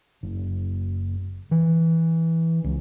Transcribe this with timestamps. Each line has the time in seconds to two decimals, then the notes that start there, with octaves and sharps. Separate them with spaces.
0.23 F#1
1.51 E3
2.64 C#2